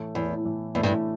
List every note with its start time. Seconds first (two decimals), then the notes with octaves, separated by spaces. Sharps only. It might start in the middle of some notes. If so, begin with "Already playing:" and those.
Already playing: A2 E3 A3
0.15 E2 A2 E3 A3
0.45 A2 E3 A3
0.74 E2 A2 E3 A3
0.83 G2